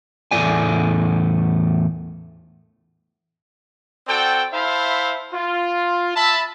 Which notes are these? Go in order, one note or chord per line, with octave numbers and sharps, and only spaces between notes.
E2 A2 A3 D5 G#5
C4 F#4 A4 D5 G5
E4 C5 E5 F5 A5 B5
F4
E5 A5 B5